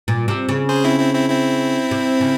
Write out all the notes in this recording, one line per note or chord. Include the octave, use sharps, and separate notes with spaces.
A#2
C3
C#3
G#4 C5
C4 E4
C4 E4
C4 E4
C4 E4
C3
C#3